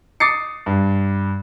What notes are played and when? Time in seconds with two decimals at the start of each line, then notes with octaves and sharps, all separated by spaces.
0.20 D6 D#6 A6 C7 C#7
0.66 G2